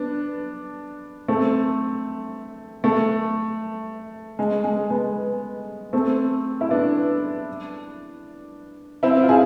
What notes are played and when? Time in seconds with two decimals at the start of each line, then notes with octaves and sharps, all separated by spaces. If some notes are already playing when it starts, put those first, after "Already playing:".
Already playing: B3 D4
1.28 A3 C4
2.84 A3
4.39 G#3
4.64 G#3
4.90 G#3 B3
5.93 A3 C4
6.61 E4
6.71 B3 D4
9.03 C4 E4
9.22 F4
9.29 E4 G#4